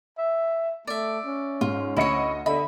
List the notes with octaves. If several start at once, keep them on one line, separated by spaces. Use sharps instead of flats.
E5
A3 D5 E5
C#4
G#2 F4
D2 E4 C#5 D#5 C#7
D3 D#5 E5 B5